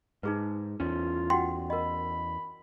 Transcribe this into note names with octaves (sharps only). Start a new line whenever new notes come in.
G#2 D#4 G#4 B4
E2 C#4 F4
F#4 F#5 G5 C6
A#4 D#5 B5